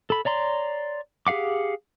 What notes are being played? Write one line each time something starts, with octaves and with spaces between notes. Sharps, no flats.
A4 B5
C#5 D5 A#5 C6
G4 G#4 F5 F#5 D6